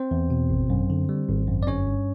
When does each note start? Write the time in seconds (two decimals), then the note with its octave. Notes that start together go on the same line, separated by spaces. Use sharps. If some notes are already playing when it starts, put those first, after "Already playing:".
Already playing: C4 C5
0.11 E2
0.30 B2
0.50 G#1
0.70 F#2
0.90 D3
1.09 G3
1.28 G#1
1.48 F#2
1.63 D5
1.67 G1 C#4 C#5
1.87 G2